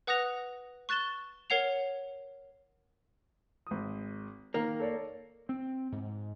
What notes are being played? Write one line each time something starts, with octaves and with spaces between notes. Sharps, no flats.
B4 F#5 D#6 F#6 A#6 F7
C#6 F#6 A6 E7 G7
A#4 C#5 F#5 C7 F7
G#1 D#6
D#3 A#3
A4 C#5 D5
C4
G#2